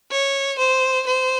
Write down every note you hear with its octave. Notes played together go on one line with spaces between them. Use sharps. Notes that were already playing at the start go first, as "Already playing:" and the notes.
C#5
C5
C5